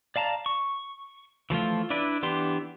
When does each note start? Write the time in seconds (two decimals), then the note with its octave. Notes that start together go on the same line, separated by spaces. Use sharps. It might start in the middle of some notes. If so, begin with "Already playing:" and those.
0.16 D5 F5 A5 A#5
0.46 C#6
1.50 E3 F3 A3 F4
1.90 D4 E4 B4 D5
2.23 E3 B3 D4 G4 C6